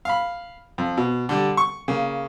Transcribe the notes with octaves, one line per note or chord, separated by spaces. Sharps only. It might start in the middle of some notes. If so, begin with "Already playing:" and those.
F5 B5
F2
B2
D3 G3
C#6
C#3 A#3